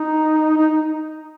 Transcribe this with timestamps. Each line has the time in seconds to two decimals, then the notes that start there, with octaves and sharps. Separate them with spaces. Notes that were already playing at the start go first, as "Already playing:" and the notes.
Already playing: D#4
0.57 D#4